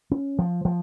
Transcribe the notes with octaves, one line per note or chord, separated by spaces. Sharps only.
C#4
F3
F3